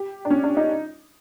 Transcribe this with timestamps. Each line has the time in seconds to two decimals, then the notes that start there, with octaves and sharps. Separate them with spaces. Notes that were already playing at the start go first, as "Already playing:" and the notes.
Already playing: G4
0.25 D4
0.30 C#4
0.44 D4
0.57 D#4